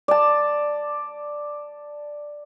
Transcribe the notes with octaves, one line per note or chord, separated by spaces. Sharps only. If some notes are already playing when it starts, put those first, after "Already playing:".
D5 A5